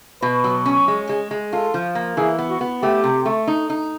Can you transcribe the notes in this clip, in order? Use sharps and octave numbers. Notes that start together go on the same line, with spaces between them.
B2 B4
F#3
C#4
G#3
G#3
G#3
F4 A4
F3
A#3
E3 G#4
B3
F#4
B3
A3 G4
C3
A3
D#4
D#4